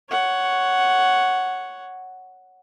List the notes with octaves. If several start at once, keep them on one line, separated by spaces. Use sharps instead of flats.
C#5 F#5